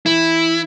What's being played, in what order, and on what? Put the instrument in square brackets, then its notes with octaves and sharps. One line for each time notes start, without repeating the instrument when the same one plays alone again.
[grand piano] E3 [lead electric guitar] E4